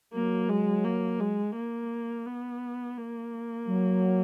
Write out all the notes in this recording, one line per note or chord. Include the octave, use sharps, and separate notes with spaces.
F#3 A#3
G#3
A#3
G#3
A#3
B3
A#3
F#3